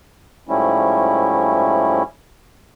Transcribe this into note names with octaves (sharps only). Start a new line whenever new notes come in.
G#2 F3 G3 A3 C#4 E4